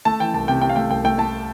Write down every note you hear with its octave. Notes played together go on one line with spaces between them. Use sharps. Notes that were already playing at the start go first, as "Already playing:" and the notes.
A3 A5
E3 G5
C2 A5
C3 G5
C3 G5
F5
A3 G5
C2 G5
A3 G5
A3 A5